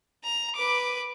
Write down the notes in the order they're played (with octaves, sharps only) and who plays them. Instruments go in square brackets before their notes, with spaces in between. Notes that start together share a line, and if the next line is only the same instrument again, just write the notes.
[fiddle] A#5
B4 D6